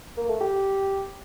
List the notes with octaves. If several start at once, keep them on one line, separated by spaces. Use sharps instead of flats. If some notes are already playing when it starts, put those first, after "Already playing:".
A#3
A3
G4